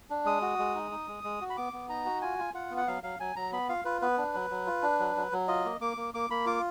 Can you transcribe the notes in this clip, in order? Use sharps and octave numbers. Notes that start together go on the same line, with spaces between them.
D4
G#3 D#6
F#4
G#3
D#4
D#4
G#3
G#3
F#4
B5
B3 D6
B3
D#4 A#5
F#4
F4 G#5
F4
F4 F#5
B3
F#5
F#3 F5
F#3 F5
F#3 G#5
F#3 A#5
B3 B5
F4 F5
F4 B4
B3 B4
D4
F#3
F#3
F4
D4
F#3
F#3
F#3
F4 D#5
A#3
A#3 D6
A#3
A#3 D6
A#3 B5
F4 D6